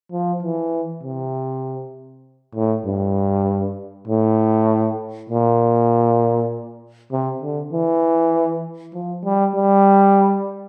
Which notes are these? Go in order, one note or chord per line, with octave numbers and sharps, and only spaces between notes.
F3
E3
C3
A2
G2
A2
A#2
C3
D3
E3
F3
G3
G3